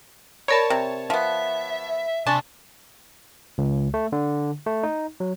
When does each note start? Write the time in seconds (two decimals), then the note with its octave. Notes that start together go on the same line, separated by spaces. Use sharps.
0.48 A#4 C#5 D5 A5 B5
0.70 C3
1.10 F3 B3 E5
2.27 C3 D4 G#5 A5 C6 C#6
3.58 C#2
3.94 A3
4.12 D3
4.66 A3
4.83 D#4
5.20 F#3